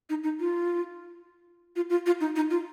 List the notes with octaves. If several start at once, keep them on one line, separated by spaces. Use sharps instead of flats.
D#4
D#4
F4
F4
F4
F4
D#4
D#4
F4